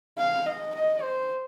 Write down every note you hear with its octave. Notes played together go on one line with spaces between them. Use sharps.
F5
D#5
D#5
C5